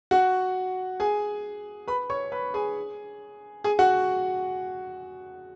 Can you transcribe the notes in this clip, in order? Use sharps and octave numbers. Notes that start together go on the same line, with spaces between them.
F#4 F#5
G#4 G#5
B4 B5
C#5 C#6
B4 B5
G#4 G#5
G#4 G#5
F#4 F#5